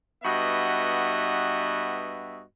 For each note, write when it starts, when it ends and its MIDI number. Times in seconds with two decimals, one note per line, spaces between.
0.23 2.42 43
0.23 2.42 59
0.23 2.42 66
0.23 2.42 75
0.23 2.42 76